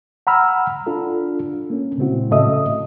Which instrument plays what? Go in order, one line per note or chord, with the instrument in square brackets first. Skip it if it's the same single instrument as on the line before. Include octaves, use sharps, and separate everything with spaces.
[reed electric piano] F#5 A#5 B5 E6 F6
D4 F4 A4
A#3 C#4
A#2 C#3 G#3 C4 E4 F#4
A2 C#3 A4 D#5 E5 D#6